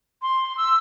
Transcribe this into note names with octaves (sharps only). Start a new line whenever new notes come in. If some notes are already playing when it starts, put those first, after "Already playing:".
C6
E6